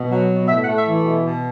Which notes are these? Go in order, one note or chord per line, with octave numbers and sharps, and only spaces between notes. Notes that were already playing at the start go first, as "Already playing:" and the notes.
Already playing: B2
F#3
B2
A2 E5
F#5
A3
E5
E3
B2
B2